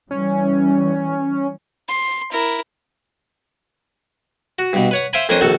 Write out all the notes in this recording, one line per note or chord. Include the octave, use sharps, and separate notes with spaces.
E3 G3 C#4
C6
E4 A#4
F#4
G2 B2
B4 C#5 F#5
C5 E5 F5 G5 G#5 B5
F2 A#3 C#4 D4 C5 D#6
A#1 D#3 F#4 A4